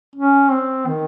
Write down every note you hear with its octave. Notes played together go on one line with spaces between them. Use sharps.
C#4
C4
D#3